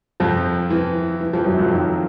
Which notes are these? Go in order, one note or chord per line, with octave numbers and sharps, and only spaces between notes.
F2 F3
E3
E3
F2 F3
F#2 F#3
F2 F3
D#3